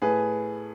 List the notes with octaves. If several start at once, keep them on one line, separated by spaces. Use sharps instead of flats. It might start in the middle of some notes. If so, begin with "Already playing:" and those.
A2 G#4 B4